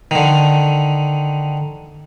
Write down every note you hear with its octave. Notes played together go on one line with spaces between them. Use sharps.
D3 D#3